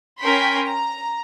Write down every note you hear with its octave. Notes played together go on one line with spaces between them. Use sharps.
C#4 A#4 G5 B5 C6 B6
A#5